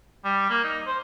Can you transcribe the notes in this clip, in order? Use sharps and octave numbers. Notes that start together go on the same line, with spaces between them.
G3
A#3
D#4
C5